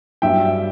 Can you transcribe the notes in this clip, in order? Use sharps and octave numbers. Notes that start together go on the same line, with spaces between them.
G2 F#3 E5 G5